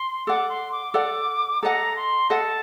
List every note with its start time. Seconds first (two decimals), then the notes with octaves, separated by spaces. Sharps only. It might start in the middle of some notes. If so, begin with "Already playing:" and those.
Already playing: C6
0.27 A4 D5 F#5 D6
0.49 C6
0.72 D6
0.94 A4 D5 F#5 D6
1.62 A4 D#5 F#5 A#5
1.96 C6
2.30 A4 D#5 F#5 A5